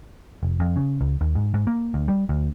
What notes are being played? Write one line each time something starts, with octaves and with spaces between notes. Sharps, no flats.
F1
F2
C#3
C#2
D#2
G#2
G#2
A#3
D2
G3
D2